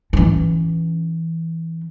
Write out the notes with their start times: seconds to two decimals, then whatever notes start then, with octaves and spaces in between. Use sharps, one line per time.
0.13 E3 C#4